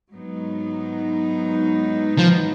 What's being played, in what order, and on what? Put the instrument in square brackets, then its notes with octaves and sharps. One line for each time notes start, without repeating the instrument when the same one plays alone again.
[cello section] G#2 F#3 B3 D#4
[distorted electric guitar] F3